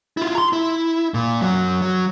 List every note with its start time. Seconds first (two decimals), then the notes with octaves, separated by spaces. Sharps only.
0.17 E4 F4
0.35 A#5 C6
0.53 E4
1.14 A#2
1.41 F#2 F#3
1.82 F#3